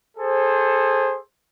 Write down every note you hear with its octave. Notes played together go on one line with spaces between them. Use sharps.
G#4 A4 C5